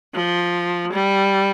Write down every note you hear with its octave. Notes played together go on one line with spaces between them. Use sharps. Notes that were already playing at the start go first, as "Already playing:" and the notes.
F3
G3